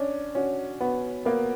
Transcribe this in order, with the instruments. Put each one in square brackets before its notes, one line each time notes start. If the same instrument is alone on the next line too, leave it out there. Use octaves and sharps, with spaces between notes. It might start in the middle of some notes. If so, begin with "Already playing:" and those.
Already playing: [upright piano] C#4 [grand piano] D4
[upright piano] C#4 [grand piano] F#4
[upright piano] B3 [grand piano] F#4
[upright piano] A#3 [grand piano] B3